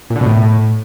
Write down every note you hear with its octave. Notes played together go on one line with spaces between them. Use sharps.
A#2
D3
B2
A2